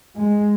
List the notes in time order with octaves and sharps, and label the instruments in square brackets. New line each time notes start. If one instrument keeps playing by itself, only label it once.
[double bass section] G#3